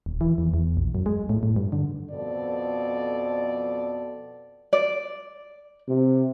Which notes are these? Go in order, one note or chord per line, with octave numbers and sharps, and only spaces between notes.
D#1
E3
E2
E2
A#1
F#2
G#3
A2
A2
G2
D3
F2 B2 A4 D5
D5
C3